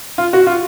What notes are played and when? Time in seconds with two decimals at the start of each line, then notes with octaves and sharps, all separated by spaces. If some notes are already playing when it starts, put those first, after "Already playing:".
0.18 F4
0.33 F#4
0.47 F4